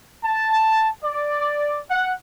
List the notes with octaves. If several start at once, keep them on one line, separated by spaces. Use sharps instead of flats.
A5
D5
F#5